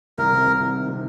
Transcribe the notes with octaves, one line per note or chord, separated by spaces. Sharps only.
C2 A#4
C3
C2
C2
D#3
C3